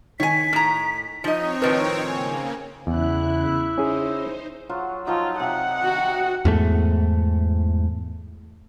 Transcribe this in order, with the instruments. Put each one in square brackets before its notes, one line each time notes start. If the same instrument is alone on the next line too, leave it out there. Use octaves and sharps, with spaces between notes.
[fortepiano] D#3 [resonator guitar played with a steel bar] C#5 G#5 [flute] B6
[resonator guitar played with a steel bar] A2 A#5
[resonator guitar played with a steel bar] F3 D#5 [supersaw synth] C4 C#5 [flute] D#4
[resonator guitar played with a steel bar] A2 D#3 F3 [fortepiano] B4
[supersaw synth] C#3 A#3 [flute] G#5
[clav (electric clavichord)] E2 [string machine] C#3 F#6 [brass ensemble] E4
[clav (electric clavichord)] C#4 G#4 [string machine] D#4 C5
[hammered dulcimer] F#3 F4 F#4
[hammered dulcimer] F3 F#3 D#4 [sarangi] F4
[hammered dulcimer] C3 G4 F5 [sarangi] F#5
[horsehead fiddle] F#4
[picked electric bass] E2 G#2 A3